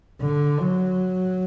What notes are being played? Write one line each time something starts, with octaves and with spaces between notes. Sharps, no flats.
D3
F#3